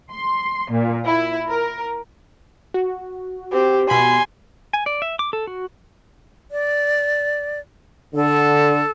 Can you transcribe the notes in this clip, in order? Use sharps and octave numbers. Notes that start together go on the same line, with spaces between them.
C6
A#2
E4
A#4
F#4
C4 G4
B2 G#5 B5 C6
G#5
D5
E5
D6
A4
F#4
D5
D3 A4